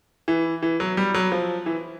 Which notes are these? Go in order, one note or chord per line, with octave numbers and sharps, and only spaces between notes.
E3
E3
F#3
G3
F#3
F3
E3